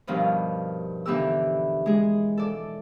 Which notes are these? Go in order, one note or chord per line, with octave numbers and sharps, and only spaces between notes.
G2 B2 D#3 F3
D3 E3 B3 D#4 G4 E6
G#3 G#4
A4 D5